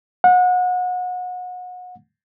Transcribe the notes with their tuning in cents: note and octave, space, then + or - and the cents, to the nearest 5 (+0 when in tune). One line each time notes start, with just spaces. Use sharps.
F#5 -30